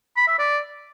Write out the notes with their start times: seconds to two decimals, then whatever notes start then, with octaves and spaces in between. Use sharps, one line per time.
0.17 B5
0.28 E5
0.39 D5